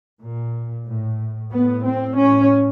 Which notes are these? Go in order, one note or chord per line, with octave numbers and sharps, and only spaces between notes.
A#2
A2
A2 B3
C4
A2 C#4